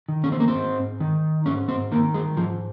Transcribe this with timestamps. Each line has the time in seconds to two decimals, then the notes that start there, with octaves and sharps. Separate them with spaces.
0.09 D#3
0.24 C#4
0.32 C4
0.40 A#3
0.48 C4
0.55 G#2
1.00 D#3
1.46 G#2 C#4
1.68 C4
1.92 D#3 A#3
2.14 G#3
2.37 G#2 F3